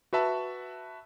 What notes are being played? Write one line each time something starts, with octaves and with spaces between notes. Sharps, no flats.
F#4 B4 E5 A5 B5